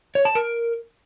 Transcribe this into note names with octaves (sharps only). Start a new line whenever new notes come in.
C#5
A5
A#4